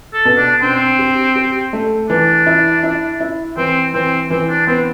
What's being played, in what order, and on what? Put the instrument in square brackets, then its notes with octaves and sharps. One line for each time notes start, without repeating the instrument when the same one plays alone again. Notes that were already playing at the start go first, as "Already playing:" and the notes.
[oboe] A4
[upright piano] B2
[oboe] D4
[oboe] C4 [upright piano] D4
[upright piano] G4
G4
A3
[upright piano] E3 [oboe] D4
[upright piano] E4
E4
E4
[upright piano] E3 [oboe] C4
[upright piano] E3 [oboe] C4
[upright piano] E3 [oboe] C4
[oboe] D4
[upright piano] B3 [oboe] C4